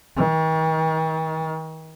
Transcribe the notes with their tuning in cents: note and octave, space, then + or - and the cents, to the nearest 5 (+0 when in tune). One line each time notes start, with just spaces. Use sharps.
D#3 +45